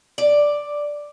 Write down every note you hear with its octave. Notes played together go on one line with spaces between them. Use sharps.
D5